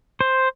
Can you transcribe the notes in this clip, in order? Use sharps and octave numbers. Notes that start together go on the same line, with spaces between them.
C5